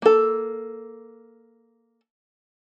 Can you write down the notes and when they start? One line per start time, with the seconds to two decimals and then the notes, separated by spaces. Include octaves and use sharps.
0.02 A#3 A4